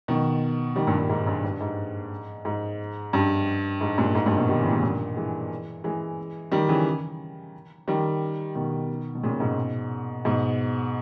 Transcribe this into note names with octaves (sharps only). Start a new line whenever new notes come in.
B2 D#3
D#3 G3
G2 A#2
G2
G#2
G2
G2
G#2
G#2
G2
G#2
G2 A#2
G#2
G2 A#2
G#2 B2
D#3 G3
C#3 E3
A#2 C#3
G2 A#2
E3 G#3
E3 G#3
D#3 G3
C#3 E3
D#3 G3
B2 D#3
B2
A#2 C#3
G#2 B2
G#2 B2